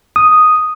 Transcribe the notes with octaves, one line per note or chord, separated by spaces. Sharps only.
D#6